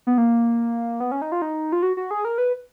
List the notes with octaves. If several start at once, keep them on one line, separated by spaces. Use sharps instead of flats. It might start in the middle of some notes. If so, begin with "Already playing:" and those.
B3
A#3
B3
C#4
D#4
F4
D#4
F4
F#4
F#4
G#4
A#4
B4